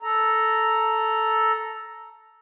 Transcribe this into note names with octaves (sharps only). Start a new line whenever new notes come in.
A4 A#5